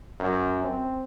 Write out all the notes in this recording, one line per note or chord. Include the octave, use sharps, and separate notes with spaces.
F#2
C4